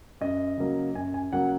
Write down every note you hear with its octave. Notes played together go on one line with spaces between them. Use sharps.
F#2 D#5
C#3 F#3 A#3
F#2 G#5
G#5
C#3 F#3 A#3 F#5